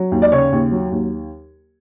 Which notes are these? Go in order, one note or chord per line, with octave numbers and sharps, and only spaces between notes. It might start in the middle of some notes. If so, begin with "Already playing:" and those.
Already playing: F#3
D#2
D5
C#3 C#5
D#2
F#3
D#2